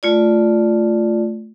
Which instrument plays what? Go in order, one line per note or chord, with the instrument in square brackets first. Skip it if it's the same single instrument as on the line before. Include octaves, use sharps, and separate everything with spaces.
[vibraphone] A3 F4 D5